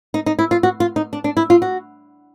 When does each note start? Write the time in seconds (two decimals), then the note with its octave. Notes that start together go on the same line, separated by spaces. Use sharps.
0.14 D#4
0.26 D#4
0.39 E4
0.51 F4
0.63 F#4
0.80 F4
0.96 D#4
1.13 D4
1.24 D4
1.37 E4
1.50 F4
1.62 F#4